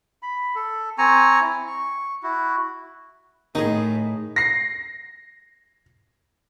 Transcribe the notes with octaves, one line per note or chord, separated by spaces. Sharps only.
B5
A4
C4 G#5 A#5 C#6
E4
C#6
E4 F#4
A2 D#3 D#4 G#4
A#6 C7